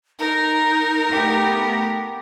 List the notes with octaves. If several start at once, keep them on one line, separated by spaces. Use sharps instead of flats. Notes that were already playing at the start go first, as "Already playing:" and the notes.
D#4 A#4
A3 B3 G4